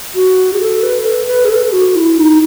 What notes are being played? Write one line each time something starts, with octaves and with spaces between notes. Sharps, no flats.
F#4
G#4
A4
B4
A4
B4
G#4
A4
F#4
E4
D#4